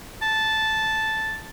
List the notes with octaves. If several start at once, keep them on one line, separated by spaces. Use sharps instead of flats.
A5